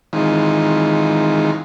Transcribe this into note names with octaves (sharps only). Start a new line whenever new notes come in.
D#3 E3 G#3 C4 D#4 F4